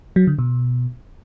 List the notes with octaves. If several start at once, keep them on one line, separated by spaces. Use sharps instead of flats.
F#3
D3
B2